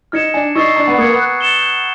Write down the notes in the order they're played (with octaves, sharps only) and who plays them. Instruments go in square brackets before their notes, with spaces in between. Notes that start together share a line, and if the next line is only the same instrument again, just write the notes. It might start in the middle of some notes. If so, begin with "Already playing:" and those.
[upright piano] D#4 [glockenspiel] F6 G#6 C#7 E7
[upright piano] D4 [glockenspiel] G#5
[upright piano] D#4 [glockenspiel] C#6 E6 A6 C7
[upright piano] D4 [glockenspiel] A#5
[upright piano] B3
[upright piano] A#3 [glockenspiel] D#6 G#6 C#7
[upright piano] B3
[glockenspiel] F#6
A6 C#7 E7 G7
G6